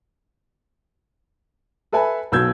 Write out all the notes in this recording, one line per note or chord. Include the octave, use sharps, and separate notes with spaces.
A4 B4 E5 G#5 A5 B5
B1 B2 E6 G6 G#6